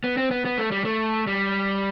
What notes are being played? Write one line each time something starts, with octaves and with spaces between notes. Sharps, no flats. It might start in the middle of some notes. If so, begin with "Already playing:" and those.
B3
C4
B3
B3
A3
G3
A3
G3